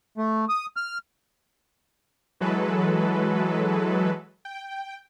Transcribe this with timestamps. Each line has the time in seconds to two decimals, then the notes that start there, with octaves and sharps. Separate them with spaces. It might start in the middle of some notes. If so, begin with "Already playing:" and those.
0.18 A3
0.49 D#6
0.77 F6
2.40 E3 F#3 G#3 A4 B4
4.45 G5